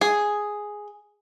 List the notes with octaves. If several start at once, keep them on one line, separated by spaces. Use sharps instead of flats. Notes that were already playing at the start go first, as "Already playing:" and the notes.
G#4